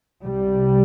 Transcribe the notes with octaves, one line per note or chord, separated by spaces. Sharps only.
C2 C3 G3